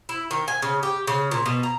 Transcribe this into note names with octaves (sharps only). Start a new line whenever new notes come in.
E4
D#3
G#5
C#3
G4
C#3
A#2
B2
A#5